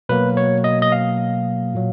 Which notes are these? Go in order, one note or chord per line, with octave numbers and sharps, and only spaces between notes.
B2 F#3 A#3 B4
C#5
D#5
D#5
F5
A#2 F#3